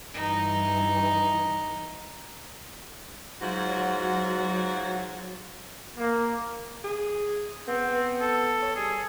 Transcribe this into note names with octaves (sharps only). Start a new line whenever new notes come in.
G2 E3 D#4
G#2 F#3 F4 F#4
A#3
G#4
B3 C4
A4
C#5
G3 G#4